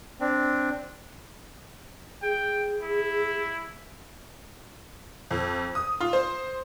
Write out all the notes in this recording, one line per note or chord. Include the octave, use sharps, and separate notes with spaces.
C4 D4
G#4 G5
E4
F2
D#6
F4
C5